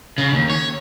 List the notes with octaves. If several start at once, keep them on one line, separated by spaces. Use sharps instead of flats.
C#3
D#2
C#5